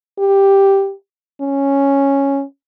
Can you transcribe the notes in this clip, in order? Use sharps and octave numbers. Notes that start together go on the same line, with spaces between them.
G4
C#4